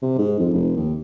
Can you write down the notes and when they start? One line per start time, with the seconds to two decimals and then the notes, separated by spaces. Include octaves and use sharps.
0.02 C3
0.18 G#2
0.39 F2
0.53 F1
0.77 D#2